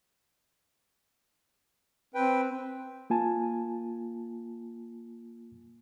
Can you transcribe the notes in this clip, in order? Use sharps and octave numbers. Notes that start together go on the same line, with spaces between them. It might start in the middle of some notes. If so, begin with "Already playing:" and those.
C4 B4 G5
A#3 F4 G#5 A5